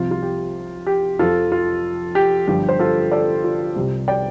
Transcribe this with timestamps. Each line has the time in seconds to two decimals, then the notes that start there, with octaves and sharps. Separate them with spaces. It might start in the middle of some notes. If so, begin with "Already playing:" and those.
Already playing: C2 C3 F3 F4
0.11 F4
0.22 G4
0.87 G4
1.19 F2 F3 F4 A4
1.52 F4
2.15 G4
2.48 G1 G2 F3 G4
2.69 C5
2.79 F4 A4
3.11 A4 D5
3.44 F4
3.76 C2 C3 G3 G4
4.08 D5 G5